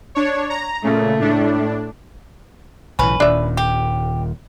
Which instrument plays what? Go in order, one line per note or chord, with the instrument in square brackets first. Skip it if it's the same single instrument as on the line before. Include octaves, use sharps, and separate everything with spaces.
[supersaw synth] D4 C#5
A#5
[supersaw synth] A#2 C#3 [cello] A3
[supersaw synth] A2 D4
[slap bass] B1 A2 E3 [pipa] C#4 B4
[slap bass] D#1 A#2 D#3 [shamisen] D4 E5
[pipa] G4